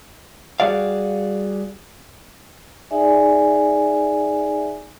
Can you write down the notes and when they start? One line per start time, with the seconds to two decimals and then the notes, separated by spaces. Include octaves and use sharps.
0.60 G3 F#4 G#4 D5 F5
2.91 D#4 G#4 D5 E5 G#5